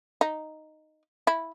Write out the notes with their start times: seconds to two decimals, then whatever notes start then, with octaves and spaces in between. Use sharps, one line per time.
0.21 D#4
1.27 E4